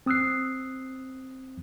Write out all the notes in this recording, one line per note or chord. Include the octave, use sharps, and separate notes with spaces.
C4 D#6 E6 F#6 C7